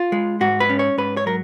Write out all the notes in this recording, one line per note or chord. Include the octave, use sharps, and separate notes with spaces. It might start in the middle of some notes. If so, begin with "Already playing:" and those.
Already playing: F4
G#3
G#2 F#4
B4
C#4
C#5
G#2 B4
C#5
F#3 A#4